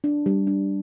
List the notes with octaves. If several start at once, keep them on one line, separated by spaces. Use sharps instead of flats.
D4
G3
D4